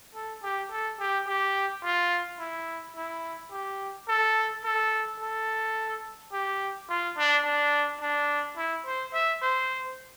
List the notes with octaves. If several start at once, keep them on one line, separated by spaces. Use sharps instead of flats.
A4
G4
A4
G4
G4
F4
E4
E4
G4
A4
A4
A4
G4
F4
D4
D4
D4
E4
C5
E5
C5